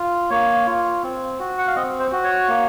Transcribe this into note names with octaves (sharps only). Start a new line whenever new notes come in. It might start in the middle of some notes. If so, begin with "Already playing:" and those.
Already playing: F4
A#3 C#5
F4
C4
F#4
F#5
F5
C4 D#5
C5
F#4
C#5
A#3